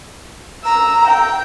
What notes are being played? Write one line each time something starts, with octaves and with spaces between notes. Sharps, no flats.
A#5 E6
G5